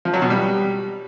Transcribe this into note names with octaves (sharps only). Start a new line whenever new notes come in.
F3
F#3
B2
G3